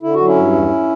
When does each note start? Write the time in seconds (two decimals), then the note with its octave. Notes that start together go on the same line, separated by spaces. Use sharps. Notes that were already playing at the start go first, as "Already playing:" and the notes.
0.03 D3 E4
0.14 F#4
0.20 F#3
0.26 C#4 E4
0.36 G2
0.53 E2